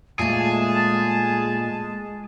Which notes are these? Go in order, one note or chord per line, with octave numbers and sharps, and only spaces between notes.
A#2 G#3 A3 G#4 A5